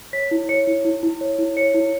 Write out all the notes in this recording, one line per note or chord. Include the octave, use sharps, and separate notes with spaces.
C#5 B6
E4
C#5 C#7
E4
E4
E4
C#5
E4
C#5 C#7
E4